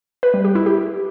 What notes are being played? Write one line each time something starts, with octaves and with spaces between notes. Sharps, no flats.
B4
G3
G4
E4
G4